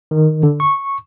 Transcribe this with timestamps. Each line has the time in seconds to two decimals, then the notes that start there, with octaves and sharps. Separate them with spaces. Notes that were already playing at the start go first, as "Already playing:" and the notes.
0.11 D#3
0.43 D3
0.60 C#6